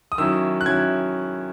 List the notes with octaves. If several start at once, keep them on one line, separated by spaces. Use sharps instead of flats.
D#6
D#3 F#3 C#4 E4 E6
F#6
D#3 F#3 C#4 E4 G#6